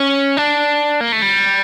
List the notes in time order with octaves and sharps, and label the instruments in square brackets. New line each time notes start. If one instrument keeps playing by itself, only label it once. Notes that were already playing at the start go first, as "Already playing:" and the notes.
Already playing: [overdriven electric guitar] C#4
D4
A#3
A3
G3